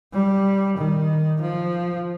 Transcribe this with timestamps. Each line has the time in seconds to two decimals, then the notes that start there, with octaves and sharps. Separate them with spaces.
0.13 G3
0.77 D#3
1.41 F3